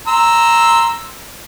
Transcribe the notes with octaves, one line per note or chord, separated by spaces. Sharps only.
A#5 C6 E6